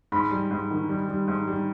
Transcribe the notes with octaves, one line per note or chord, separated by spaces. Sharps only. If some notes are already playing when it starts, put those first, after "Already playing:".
G#2 B5
G3
G#2
D#3
G3
G3
G#2
G3